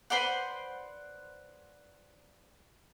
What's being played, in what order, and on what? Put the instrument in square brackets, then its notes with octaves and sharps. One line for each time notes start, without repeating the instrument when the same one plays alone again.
[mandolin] B4 C5 D5 F#5